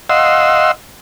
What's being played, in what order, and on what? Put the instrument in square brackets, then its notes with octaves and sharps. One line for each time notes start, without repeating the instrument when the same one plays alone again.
[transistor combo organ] D#5 F5 F#5 C6 E6